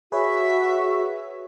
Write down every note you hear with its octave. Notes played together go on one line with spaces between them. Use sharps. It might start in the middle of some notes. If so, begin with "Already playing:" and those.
F#4 G#4 B4 C#5 E5